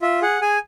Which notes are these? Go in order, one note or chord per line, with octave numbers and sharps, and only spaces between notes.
F4 E5
G#4 F#5
G#4 G#5